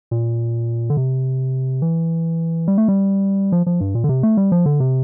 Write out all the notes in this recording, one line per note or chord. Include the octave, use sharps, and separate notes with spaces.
A#2
D3
C3
E3
G3
A3
G3
F3
F3
G2
A#2
D3
C3
A3
G3
F3
D3
C3